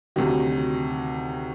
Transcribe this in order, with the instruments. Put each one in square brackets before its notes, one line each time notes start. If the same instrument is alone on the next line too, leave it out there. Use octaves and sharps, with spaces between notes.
[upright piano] D2 C3 D#3 F#3